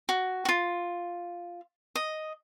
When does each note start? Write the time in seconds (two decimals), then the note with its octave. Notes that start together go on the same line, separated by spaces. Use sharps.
0.09 F#4
0.45 F4 F#4
1.95 D#5